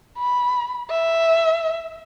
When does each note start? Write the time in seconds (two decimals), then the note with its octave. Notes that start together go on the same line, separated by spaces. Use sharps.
0.18 B5
0.90 E5